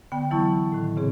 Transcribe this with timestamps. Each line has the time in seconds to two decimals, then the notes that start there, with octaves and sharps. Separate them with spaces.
0.12 D3 B3 G5
0.31 E3 F#3 B3 E4 A5 C#6
0.72 A2 D#3
0.96 A#2 C#3 C4 G#4